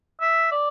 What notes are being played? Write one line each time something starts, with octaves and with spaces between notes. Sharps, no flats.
E5
D5